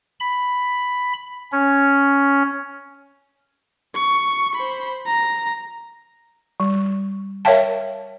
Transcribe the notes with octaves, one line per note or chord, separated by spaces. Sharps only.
B5
C#4
C#6
C5 B5
A#5
G3
A#4 C#5 E5 F5 G5 A5